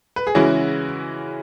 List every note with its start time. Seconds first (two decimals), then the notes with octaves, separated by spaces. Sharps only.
0.16 B4
0.27 G#4
0.35 C#3 E3 G#3 C#4 E4 F#4